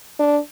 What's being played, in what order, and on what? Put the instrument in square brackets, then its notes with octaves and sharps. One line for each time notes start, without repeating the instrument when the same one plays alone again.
[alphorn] D4